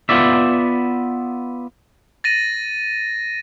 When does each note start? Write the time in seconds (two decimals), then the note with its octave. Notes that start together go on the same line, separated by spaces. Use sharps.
0.09 B3 F4 D5 E5
2.24 A6 A#6 D#7